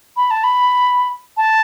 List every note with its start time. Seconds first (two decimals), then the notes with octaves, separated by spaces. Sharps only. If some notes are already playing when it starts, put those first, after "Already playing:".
0.17 B5
0.31 A5
0.44 B5
1.37 A5